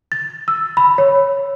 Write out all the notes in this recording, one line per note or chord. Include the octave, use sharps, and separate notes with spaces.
A6
E6
B5
C#5